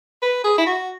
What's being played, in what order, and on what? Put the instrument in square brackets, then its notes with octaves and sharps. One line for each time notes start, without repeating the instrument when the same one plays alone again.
[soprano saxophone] B4
G#4
E4
F#4